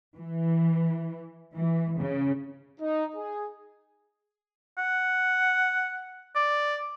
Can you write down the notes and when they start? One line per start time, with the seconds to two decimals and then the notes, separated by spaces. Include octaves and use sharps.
0.17 E3
1.55 E3
1.98 C#3
2.81 D#4
3.16 G#4
4.78 F#5
6.36 D5